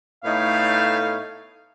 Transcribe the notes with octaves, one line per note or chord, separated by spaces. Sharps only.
A2 A3 B3 D#4 C#5 F5